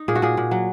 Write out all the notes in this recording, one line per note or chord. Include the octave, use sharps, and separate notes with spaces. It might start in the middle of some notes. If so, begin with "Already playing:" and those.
Already playing: D#4
A#2 G#4
F#4
A#2 G#4
A#2
F#3